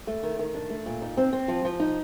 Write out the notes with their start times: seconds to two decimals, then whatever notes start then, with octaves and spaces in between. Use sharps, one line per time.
0.07 A3
0.23 D#3
0.39 D#3
0.55 D4
0.70 A3
0.86 A#2
1.02 D#4
1.17 C4
1.33 C4
1.48 F3
1.65 F3
1.80 D#4